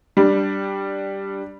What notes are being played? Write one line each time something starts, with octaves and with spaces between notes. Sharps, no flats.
G3 D4